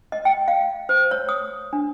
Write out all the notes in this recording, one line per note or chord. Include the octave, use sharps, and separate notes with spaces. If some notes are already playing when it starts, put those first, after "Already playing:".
D#5
G5
F5
C5
C#5
D#6
D4